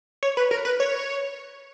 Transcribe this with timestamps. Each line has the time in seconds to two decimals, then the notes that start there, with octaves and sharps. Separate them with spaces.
0.23 C#5
0.37 B4
0.51 A#4
0.65 B4
0.80 C#5